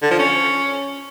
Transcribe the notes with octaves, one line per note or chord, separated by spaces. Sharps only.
D3
F3
C#4